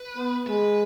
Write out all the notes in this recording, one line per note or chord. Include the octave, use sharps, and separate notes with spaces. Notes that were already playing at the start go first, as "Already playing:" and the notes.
Already playing: B4
B3
G#3 B4